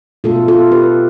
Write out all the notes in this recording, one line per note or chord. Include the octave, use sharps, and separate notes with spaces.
B2 A3 F4 A4
F4 A4
G4 B4